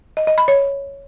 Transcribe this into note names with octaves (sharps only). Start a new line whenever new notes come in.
D#5
D#5
B5
C#5